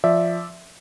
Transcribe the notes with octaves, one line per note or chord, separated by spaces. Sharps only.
F3 D5 E5